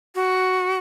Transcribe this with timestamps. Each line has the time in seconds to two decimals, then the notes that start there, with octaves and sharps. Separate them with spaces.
0.15 F#4